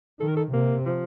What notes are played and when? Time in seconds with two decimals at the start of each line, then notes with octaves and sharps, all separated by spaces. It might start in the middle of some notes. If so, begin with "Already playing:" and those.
0.20 D#3 A4
0.28 A#4
0.37 A4
0.53 C3 A#3
0.85 F3